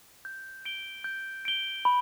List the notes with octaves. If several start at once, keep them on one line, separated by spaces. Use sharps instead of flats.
G6
D7 G7
G6
D7 G7
B5